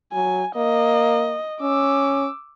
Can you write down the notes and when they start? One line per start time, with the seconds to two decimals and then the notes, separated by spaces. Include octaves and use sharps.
0.13 F#3 G#5
0.57 A#3 D#5
1.62 C#4 D6 E6